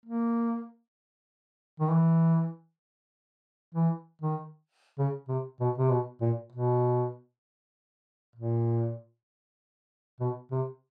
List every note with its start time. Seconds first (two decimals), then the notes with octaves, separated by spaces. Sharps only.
0.05 A#3
1.80 D#3
1.91 E3
3.75 E3
4.22 D#3
4.98 C#3
5.28 C3
5.60 B2
5.78 C3
5.90 B2
6.21 A#2
6.52 B2
8.36 A#2
10.20 B2
10.51 C3